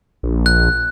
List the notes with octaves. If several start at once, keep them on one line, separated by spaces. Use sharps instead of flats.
A#1
F#6